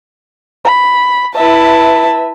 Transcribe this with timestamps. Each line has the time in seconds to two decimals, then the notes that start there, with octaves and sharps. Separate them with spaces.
0.65 B5
1.35 E4 B4 E5 A5